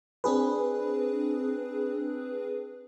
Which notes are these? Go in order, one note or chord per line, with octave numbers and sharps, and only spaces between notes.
C4 D4 G#4 B4